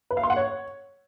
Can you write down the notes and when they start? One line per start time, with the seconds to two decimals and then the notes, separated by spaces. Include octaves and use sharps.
0.11 B4
0.17 F5
0.23 C6
0.30 F#5
0.36 C#5